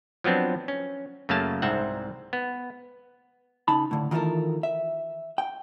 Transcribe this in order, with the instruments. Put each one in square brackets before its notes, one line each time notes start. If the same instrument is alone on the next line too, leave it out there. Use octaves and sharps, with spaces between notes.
[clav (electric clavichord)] F3 F#3 B3 C4 D4
C#4
F#2 C#3 A3 A#3 F5 A5
C2 G#2 C4 E5 F#5
B3
[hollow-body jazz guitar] C#3 D#4 A5 B5
A2 D3
D#3 E3 F4 G4 A4 A#4
E5
G5